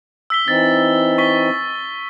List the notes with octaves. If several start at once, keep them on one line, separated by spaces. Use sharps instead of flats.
E6 B6 G7
E3 C4 D#4 A6
C#6 B6 G7